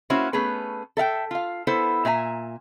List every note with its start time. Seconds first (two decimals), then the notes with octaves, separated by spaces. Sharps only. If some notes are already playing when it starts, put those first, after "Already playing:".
0.10 A#3 C#4 E4 F#4 C5
0.33 A3 B3 C#4 G#4 B4
0.97 A4 E5 F5 G5
1.31 F4 F5
1.67 B3 E4 A4 C5
2.05 A#2 E5 G#5 A#5